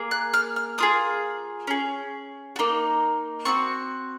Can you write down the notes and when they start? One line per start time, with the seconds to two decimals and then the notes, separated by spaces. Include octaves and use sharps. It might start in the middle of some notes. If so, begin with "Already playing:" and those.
Already playing: A#3 G#4
0.11 F#6
0.34 F6
0.56 F6
0.78 A#3 F4 G#4 D#6
1.67 C#4 G#4
2.56 F#4
2.59 A#3 D#4
3.45 C4 F#4 C#6